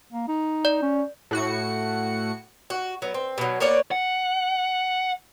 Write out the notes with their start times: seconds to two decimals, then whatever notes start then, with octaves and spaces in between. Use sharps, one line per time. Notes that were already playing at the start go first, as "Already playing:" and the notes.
0.13 A#3
0.28 D#4
0.65 D5
0.82 C#4
1.31 A2 F#4 C#7
2.70 F#4
3.02 F#3 B3
3.14 C4
3.38 B2 F#3
3.60 A#3 B3 C#5 D5
3.91 F#5